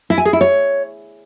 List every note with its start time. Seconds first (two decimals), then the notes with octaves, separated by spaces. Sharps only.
0.10 E4
0.18 G#5
0.25 G#4
0.33 E4
0.41 C#5